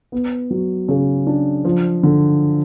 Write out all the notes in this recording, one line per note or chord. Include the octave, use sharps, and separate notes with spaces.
B3
F#3
C#3
D4
F3
D3